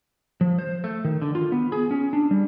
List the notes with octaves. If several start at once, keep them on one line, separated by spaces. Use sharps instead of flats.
F3
C5
A3
D#3
D3
F4
B3
G#4
C#4
D4
G3